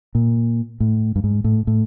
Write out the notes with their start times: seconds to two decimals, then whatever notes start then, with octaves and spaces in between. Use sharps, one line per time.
0.15 A#2
0.80 A2
1.16 G2
1.24 G#2
1.44 A2
1.67 A2